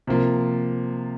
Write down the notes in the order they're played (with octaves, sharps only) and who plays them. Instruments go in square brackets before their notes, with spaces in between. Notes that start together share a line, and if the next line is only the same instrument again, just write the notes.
[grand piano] C3 F3 A#3 F4